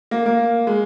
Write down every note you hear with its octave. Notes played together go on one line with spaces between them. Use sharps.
A#3
A#3
G#3